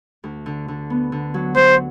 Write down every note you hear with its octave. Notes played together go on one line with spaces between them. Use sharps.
D2
D3
D3
B3
D3
F#3
F#3 C5